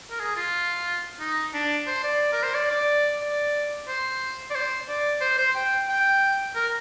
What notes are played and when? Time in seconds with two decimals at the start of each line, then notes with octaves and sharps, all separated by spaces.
0.11 A#4
0.20 G#4
0.36 F4
1.20 D#4
1.54 D4
1.87 C5
2.04 D5
2.33 A#4
2.43 C5
2.55 D5
2.71 D5
3.22 D5
3.88 C5
4.50 D5
4.55 C5
4.89 D5
5.21 C5
5.39 C5
5.55 G5
5.89 G5
6.56 A#4